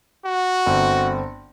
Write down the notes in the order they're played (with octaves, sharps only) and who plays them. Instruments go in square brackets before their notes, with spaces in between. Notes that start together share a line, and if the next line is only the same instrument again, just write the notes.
[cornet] F#4
[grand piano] G1 C4